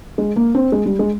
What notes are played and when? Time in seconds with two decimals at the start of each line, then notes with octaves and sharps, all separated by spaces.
0.18 G#3
0.36 A#3
0.55 C4
0.72 G#3
0.86 G3
0.99 G#3